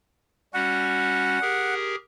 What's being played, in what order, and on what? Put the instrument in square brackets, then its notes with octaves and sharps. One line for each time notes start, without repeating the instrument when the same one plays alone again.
[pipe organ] G3 C#4 F#4 [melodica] F#5
[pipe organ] G4 G#4 A#4